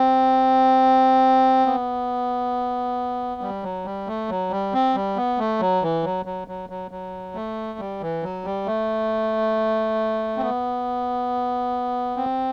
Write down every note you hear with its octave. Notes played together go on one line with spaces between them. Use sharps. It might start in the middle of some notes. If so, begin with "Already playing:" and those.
Already playing: C4
B3
G3
F#3
G3
A3
F#3
G3
C4
G3
B3
A3
F#3
E3
F#3
F#3
F#3
F#3
F#3
A3
G3
E3
F#3
G3
A3
C4
B3
C4